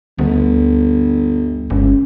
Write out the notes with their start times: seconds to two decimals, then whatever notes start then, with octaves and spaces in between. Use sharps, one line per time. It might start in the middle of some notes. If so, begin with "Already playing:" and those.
0.19 G1 D2
1.70 G1 C#2